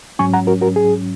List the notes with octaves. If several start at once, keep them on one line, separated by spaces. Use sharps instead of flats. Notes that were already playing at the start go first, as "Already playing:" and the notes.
G#2 F#3 C#4 G#5 C#6
F#5 A#5
F#4 A#4
F#4 A#4
G#4